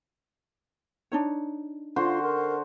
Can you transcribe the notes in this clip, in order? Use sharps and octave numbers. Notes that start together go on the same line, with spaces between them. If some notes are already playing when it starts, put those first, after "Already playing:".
D4 D#4 C#5
D3 F4 F#4 C5
A#4